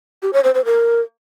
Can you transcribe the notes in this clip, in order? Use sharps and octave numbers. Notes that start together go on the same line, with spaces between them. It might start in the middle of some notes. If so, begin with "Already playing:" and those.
G4
C#5
C5
C5
A#4